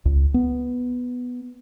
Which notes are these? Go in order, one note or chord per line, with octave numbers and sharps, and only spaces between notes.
C#2
B3